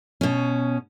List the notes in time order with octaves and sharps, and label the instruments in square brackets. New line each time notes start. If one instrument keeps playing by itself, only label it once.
[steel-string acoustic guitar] B2 C#4